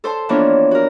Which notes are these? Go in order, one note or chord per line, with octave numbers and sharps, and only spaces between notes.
A4 C5 A5 C6
E3 F3 A#3 B3 D4 C#5
F#4 A#4